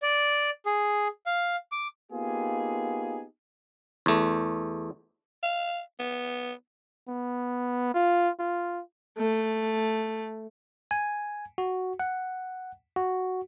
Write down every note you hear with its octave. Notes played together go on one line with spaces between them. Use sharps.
D5
G#4
F5
D6
A#3 B3 D#4 F4 G4 G#4
E2 A3
F5
B3
B3
F4
F4
A3
G#5
F#4
F#5
F#4